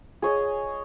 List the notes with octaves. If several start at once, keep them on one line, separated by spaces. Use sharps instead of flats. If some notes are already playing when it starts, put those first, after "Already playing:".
G#4 C#5 D#5